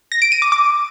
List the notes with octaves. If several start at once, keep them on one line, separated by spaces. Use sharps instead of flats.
A#6
D7
D#7
D6
D6